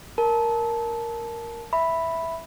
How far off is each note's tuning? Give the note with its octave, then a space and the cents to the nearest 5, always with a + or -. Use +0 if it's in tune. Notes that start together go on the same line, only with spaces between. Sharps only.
A#4 +0 A5 -15
E5 +0 B5 +0